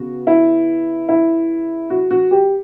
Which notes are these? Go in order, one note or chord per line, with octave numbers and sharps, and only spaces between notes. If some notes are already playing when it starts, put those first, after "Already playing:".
Already playing: C#3 B3 F#4
E4
E4
F#4
F#4
G4